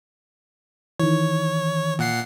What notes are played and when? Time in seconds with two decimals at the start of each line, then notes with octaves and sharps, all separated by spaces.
0.99 D#3 E3 C#5
1.99 A#2 F#5 C7